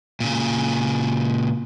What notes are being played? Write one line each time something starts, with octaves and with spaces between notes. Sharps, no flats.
A#2 C#3